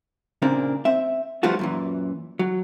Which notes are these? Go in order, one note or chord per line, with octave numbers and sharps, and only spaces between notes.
A#2 C#3 A#3 C4 D4
C4 E5
F3 G3 A3 B3 F4 F#4
F#2 A#2 E3
F#3